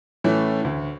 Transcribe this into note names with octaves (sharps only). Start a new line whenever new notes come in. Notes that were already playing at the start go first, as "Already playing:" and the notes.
A2 E3 A3 C#4
D2